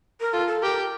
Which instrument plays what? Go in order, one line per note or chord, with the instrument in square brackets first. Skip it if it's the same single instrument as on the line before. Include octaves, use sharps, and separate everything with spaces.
[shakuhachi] A#4
[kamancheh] F4 [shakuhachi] A4
[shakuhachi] A4
[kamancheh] G4 [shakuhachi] A#4